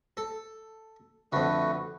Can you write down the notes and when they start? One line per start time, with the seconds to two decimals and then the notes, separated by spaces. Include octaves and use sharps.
0.17 A4
1.32 F2 D3 A3 F#4 B4